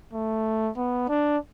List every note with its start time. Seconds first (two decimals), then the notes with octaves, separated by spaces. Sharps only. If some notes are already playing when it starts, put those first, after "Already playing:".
0.13 A3
0.77 B3
1.09 D4